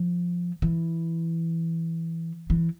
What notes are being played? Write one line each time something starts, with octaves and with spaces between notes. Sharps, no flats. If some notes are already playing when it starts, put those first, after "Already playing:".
Already playing: F3
E3
E3